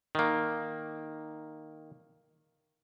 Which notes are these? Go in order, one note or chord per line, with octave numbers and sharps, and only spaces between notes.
D#3 A#3